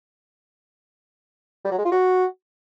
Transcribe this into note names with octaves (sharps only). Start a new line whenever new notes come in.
G3
F#3
G#3
F4
F#4